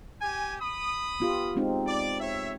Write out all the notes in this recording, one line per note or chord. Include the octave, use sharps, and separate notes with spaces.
G4 G#5
B5 D#6
B3 F4 G4
G#3 C4 D#4
D5
C#5 E5